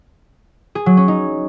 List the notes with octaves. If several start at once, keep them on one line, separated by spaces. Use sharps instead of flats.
G#4
F#3
C#4
D#4